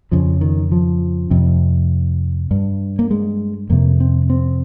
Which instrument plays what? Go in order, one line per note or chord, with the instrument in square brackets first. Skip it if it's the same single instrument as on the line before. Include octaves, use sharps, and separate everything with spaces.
[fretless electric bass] F2 C#3 F3
D#3
F3
F2 C3
G2
A#3
G#3
F2 C3 A#3
C4
C4